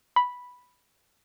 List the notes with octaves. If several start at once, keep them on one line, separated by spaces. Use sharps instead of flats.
B5